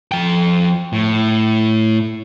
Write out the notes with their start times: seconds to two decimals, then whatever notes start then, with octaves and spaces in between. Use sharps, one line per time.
0.12 F3 G5
0.93 A2